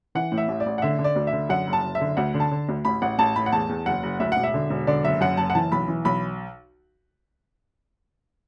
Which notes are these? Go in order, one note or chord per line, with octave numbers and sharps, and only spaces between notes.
E3 F#5
A2
E5
A1
D5
A1
F#5
D3 E5
D3
D5
D2
E5
D3
F#2 F#5
F#1
A5
F#1
E5
D3
D2 F#5
D3
A5
D3
D2
A1 B5
A1 F#5
A1 A5
A2 B5
F#5
E2 A5
E2
F#1 F#5
F#1
D2 E5
E1 F#5
E5
D3
E1
D3 D5
F#1 E5
F#2 F#5
F#1 A5
F#5
E3 A5
B1 B5
E3
B1 B5